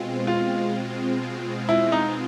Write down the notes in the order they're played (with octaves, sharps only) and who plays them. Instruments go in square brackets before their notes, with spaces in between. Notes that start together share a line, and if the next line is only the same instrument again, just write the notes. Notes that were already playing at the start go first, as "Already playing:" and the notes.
Already playing: [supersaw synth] B2 G#3 C4 F4
[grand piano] F4
E4
D#4